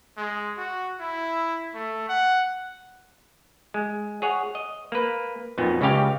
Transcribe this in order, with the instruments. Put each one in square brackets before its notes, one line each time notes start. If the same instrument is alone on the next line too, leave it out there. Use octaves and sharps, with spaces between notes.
[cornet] G#3
F#4
E4
A3
F#5
[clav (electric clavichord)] G#3
G#4 C#5 F#5
D#5
A#3 B4
F2 A#2 F#3 B3 D#4
C#2 C#3 C#4 G4 F5 G5